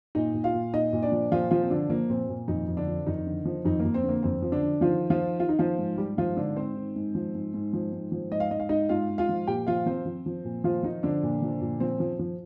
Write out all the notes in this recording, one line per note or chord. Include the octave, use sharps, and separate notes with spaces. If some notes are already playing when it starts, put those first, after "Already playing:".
A#2 D#4 D#5
A#2
F4 F5
A#2
A#2 D#4 D#5
A#2
D4 D5
F3
A#2 F3 F4
F3 F4
C4
D3 F3 D4
F3 A#3
A#2 C4
A#2
F2 D#3 D#4
F2
D3 D4
F3
F2 D#3 D#4
D3
F3
F2 D#3 D#4
F2 A#3
C4
D3
A#3
F2 C4
F3
D3 D4
D3
D#3 F3 F4
D#3
F3 F4
D#3
D#3 F4
D#4
D#3 F3 F4
G#2
G#2 G3 G4
G#2 F3 F4
G#2 D3 D4
G#2 C4 C5
D#3
G#2
F3
G#2
G#2
F3
G#2
F3
G#2 D#5
F5
G#2 D#5
F5
G#2 D#4 D#5
G#2 F4 F5
G#2
F4 F5
F3
A#2 G4 G5
F3 F4 F5
F3 C4 C5
F3
F3
A#2
F3 F4
D#3 F3 D#4
D3 F3 D4
A#2
F3
A#2
F3 C4
F3
F3